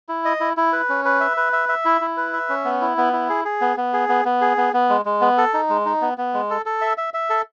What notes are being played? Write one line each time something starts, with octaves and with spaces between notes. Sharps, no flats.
E4
D#5
E4
E4
B4
C#4
B4
E5
B4
E5
E5
E4
E4
B4
E5
C#4
B3
E4
B3
E4
G#4
G#4
B3
B3
G#4
B3
B3
G#4
B3
B3
G#3
G#3
B3
A4
D#4
G#3
D#4
B3
B3
G#3
A4
A4
E5
E5
E5
A4